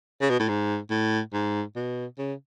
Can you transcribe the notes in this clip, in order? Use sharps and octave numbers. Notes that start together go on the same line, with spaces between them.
C#3
B2
A2
G#2
A2
G#2
B2
C#3